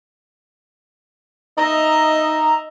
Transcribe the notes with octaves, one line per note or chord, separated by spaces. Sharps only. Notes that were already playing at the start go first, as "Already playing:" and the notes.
D#4 D#5 E5 A#5